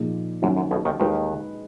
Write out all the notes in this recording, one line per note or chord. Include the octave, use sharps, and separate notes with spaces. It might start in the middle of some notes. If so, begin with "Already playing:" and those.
Already playing: A#2 F3 A#3 D#4 G#4
F#2 D#3 F#3 C#4 F#4
F#2
B1 B2
D#2 D#3
D#2 D#3 G#3 D#4 G#4 B4 D#5